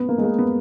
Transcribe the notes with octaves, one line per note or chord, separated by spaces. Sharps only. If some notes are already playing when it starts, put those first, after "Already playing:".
Already playing: B3
A#3
G#3
A#3
B3